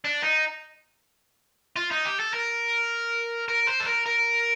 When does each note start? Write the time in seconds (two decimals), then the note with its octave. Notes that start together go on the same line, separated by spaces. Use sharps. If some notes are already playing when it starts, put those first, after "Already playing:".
0.05 D4
0.24 D#4
1.76 F4
1.91 D#4
2.05 G4
2.20 A4
2.33 A#4
3.48 A#4
3.67 C5
3.80 A4
3.86 A#4
4.06 A#4